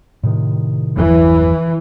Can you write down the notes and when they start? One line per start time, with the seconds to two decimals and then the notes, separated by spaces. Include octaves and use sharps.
0.23 A2 C3 D#3
0.97 G1 E2 E3 F#3